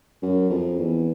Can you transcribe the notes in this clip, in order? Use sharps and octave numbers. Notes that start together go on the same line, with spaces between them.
F#2
F2
E2